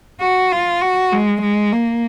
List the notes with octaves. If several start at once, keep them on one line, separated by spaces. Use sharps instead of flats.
F#4
F4
F#4
G#3
G#3
A#3